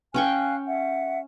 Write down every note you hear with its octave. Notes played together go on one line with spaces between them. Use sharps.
C#4 F5 G5 G#5 C#6 F#6
E5 F#5